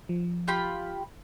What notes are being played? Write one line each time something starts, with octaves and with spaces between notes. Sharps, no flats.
F3
F4 G4 B5